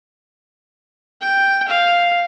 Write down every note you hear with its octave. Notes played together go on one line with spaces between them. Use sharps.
G5
F5